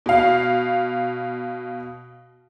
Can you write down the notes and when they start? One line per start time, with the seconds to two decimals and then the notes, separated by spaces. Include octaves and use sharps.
0.06 B2 F5